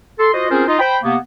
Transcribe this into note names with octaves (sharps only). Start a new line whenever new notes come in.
A4 C6
F4 F#4 C5 D#5
C4 C#4 F4 G#4 A#4 C5
D#4 F4 D#5
C5 G5 B5
C3 A#3 B3